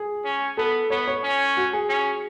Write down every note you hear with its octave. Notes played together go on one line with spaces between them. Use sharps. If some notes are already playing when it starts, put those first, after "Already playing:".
Already playing: G#4
C#4
B3 A4
B3 C#5
C#5
C#4
F#4
G#4
C#4